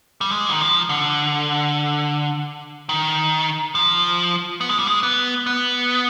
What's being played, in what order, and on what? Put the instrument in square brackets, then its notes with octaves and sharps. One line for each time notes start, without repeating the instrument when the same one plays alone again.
[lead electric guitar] G3
G#3
D#3
F3
D3
D#3
F3
B3
G#3
G3
G#3
B3
B3